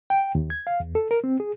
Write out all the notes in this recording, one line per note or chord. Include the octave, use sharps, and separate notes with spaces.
G5
D#2
G#6
F5
E2
A4
A#4
C4
G#4